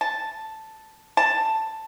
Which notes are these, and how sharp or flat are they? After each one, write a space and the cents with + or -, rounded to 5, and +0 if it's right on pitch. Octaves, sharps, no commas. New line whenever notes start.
A5 +0
A5 +5